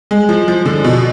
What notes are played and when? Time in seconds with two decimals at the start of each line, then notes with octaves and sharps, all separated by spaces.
0.11 G#3
0.29 F3
0.48 F3
0.66 D3
0.84 B2